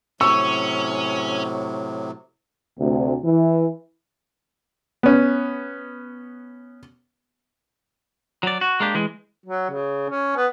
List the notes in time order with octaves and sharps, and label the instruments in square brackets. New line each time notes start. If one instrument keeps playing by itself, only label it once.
[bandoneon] A2 C3 F#3 [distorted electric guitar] C#4 [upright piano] C#6 [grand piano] E6
[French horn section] D2 C3
E3
[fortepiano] B3 C#4
[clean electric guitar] F#3 D5
F#4
G#3 A#3 D4 G4
E3 G#3
[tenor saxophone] F#3
C#3
C#4
B3